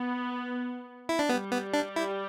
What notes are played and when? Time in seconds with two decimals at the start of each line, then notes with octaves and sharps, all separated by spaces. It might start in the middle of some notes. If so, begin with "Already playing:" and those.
Already playing: B3
1.09 E4
1.19 D4
1.29 G3 B3
1.51 B3
1.74 D4
1.96 E4